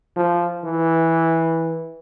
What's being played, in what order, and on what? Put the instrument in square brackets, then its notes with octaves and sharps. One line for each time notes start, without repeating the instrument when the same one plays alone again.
[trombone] F3
E3